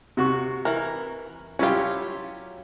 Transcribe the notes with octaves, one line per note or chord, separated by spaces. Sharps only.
C3 F#4 C#6
E3 A#4
F#3 C#4 E4 F4 G4